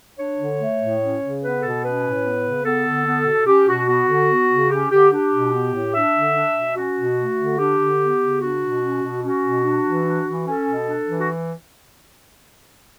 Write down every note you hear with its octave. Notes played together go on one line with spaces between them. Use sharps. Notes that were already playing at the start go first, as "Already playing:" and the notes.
D4 C#5
D3
A3
A2
C#4
C#3
B3 B4
B2 A4
C#4 B4
A2
B3
C#3
B3 A4
D3
B3
B2
C#4 G4
B2 F#4
B3 F#4
D3
B3
C#3
C#4 G4
D3 G4
D4 G4
B2
B3
A2
D4 E5
D3
D4
B2
C#4 F#4
B2
A3
D3
D4 G4
D3
B3
C#3
D4 F#4
B2
C#4
B2
C#4 F#4
B2
D4
E3
D4
E3
C#4 A4
B2
D4
E3
F#4